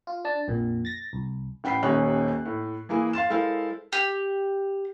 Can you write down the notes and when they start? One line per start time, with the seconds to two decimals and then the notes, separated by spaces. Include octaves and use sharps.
0.07 F4
0.25 D4 A5
0.48 A#1 F2 A#2
0.85 A6 A#6
1.13 C2
1.64 A1 F#5 G5 B5 B6 C7
1.83 D#1 D#2 C#4 D#4 F#6
2.45 A2
2.89 E3 A#3 E4 G#4
3.13 F5 C6 A6 E7
3.30 G#3 E4 A4 A#4 C5 F5
3.93 G4